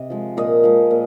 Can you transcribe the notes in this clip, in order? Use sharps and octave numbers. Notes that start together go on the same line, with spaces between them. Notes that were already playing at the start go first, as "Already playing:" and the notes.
Already playing: C3 D#5
F3 G#3
A#2 D#5
F3 G#3
A#2